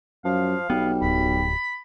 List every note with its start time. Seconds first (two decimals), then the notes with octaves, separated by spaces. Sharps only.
0.25 F#2 F3 F5
0.70 B1 G3 B3
1.02 D1 B5